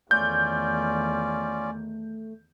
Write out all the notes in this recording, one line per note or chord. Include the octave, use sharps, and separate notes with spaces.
E2 D#3 A3 C#4 F4 D5 G6